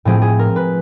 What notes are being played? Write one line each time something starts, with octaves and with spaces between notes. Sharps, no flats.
A2 F3 A3 C4 G#4
G#4
A#4
B4